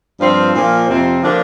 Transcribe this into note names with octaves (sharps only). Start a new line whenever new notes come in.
G2 F3 C4 F4
A#2 F3 A#3
F2 C3 F3 C4
D3 F3 A#3 D4